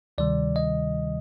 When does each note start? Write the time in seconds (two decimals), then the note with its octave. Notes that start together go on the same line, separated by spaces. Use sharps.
0.18 D2 C3 D#3 G3 D5
0.56 D#5